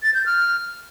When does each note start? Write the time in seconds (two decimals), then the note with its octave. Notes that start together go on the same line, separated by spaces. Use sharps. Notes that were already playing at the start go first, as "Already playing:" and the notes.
0.03 A6
0.14 G6
0.26 F6